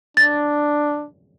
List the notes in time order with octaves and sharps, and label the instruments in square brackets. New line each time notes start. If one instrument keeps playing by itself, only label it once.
[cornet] D4 [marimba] A6